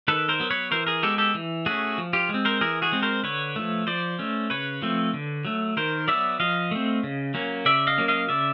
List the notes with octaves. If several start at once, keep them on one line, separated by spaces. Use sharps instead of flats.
D#3 A4 B4
A#4 C5
F#3 B3
B4 C#5
E3 A#4 C5
G#4 A#4
G#3 B3 G4 A4
G4 A4
E3
A3 C#4 F#4 G#4
F3
F4 G4
G#3
C4
A#4 C5
E3 G#4 A#4
F#4 G#4
G#3 C4
A#4 C5
D3 B4 C#5
F3 A3
F3 C5 D5
A3 C#4
C#3 B4 C#5
F3 A3 C4
D3
F#3 A3
D#3 A#4 C5
F#3 B3 D5 E5
F3 D#5 F5
A3 C4
C#3
F#3 A#3 C#4
C#3 D5 E5
D#5 F5
F#3 A#3 C#4
D#5 F5
C#3 D5 E5